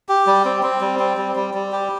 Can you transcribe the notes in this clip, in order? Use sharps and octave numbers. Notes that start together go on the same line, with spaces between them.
G4
G3
C4
C4
G3
C4
G3
G3
G3
G4